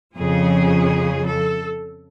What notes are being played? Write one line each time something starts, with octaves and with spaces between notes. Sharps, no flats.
F2 C#3 F3 G#4
A4